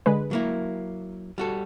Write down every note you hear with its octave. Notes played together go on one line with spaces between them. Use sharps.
D3 G#3 B4
F#3 A#3 E4
G3 F#4 A4